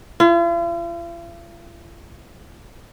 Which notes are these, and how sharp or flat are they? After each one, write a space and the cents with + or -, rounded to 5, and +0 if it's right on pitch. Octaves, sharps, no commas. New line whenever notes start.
F4 -45